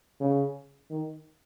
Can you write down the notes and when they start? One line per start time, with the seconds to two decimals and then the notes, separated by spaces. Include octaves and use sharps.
0.21 C#3
0.90 D#3